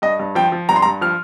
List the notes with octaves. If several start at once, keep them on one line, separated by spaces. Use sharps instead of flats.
G2 D#5
G2
F3 G5
F3
G2 A#5
C6
A#5
G2
F3 F6